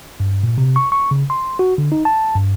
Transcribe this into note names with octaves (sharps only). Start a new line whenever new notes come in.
G2
A#2
C3
C#6
C#6
C#3
C6
F#4
D3
D#4
A5
G2